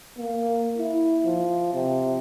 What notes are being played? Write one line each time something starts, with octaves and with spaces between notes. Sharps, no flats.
A#3
E4
F3
C3